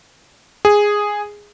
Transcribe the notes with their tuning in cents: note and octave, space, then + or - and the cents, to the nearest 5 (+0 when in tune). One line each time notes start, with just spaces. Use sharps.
G#4 -5